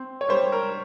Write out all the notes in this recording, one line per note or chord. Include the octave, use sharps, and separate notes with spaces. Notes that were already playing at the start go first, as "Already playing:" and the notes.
Already playing: C4
C#5
G3 C5
A#4